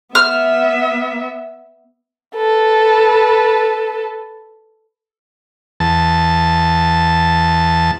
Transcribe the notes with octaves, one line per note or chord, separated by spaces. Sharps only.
B3 E5 F6
A4 B4
E2 A5